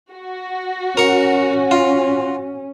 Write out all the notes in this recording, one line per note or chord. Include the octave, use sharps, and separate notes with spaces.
F#4
C#4 A#4 C#6
F4